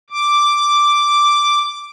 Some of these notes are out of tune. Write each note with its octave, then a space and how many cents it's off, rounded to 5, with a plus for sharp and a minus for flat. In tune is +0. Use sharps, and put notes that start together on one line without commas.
D6 +0